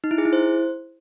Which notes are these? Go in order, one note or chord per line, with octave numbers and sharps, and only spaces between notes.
D#4
E4
G#4
E4
C5